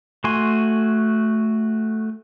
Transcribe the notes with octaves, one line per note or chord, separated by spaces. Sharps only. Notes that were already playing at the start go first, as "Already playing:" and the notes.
A3 F#4 G#5 C6